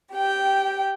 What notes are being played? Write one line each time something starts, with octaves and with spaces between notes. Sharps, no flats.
G4 G5